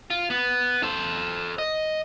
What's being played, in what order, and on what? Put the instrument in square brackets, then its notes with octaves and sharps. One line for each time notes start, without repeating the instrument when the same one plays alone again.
[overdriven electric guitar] F4
B3
A4 C5
D#5